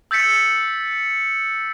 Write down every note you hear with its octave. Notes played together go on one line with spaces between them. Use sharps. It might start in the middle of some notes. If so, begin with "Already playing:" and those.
E6 G6 A6 B6 C#7